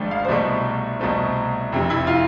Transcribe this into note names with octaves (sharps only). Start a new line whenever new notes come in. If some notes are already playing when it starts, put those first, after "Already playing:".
Already playing: G#1 G#2 F3 A3 D4
F5
C5
C2 B2 A3 D5
C2 B2 A3 C4
F1 F2 C3
E4
F4